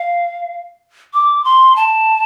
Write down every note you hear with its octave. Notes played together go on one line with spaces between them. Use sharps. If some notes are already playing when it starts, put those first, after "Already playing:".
Already playing: F5
D6
C6
A5